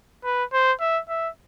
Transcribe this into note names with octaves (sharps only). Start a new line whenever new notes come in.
B4
C5
E5
E5